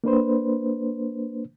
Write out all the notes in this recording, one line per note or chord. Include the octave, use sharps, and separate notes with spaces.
A#3 D4 B4 C5